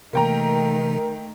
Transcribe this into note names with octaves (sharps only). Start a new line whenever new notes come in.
C3 D#3 E3 A3 A#3 A#4 G5 A#5